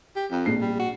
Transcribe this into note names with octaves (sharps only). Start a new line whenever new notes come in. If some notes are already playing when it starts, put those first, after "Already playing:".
G4
F2
A#1 C7
G3
F#4